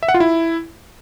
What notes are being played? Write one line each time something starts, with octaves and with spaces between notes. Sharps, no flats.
E5
F#5
F4
E4